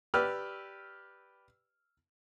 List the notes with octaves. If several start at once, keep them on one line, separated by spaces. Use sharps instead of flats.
G4 B4 D5 E6 F6